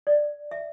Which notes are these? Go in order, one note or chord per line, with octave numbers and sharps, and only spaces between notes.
D5
E5